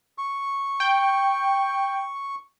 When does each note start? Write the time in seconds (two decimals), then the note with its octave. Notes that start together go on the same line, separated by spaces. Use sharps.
0.18 C#6
0.80 G5